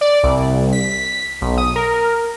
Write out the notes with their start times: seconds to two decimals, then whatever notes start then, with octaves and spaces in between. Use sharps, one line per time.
0.01 D5
0.23 C2
0.73 B6
1.41 B1
1.57 D#6
1.76 A#4